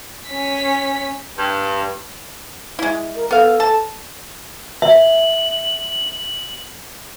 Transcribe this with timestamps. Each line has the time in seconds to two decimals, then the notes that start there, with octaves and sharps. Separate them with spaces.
0.28 C#4 B6
1.38 G2
2.79 G#3 E4
3.16 A#4
3.31 B3 A4 F5
3.60 A5
4.82 E5 F#7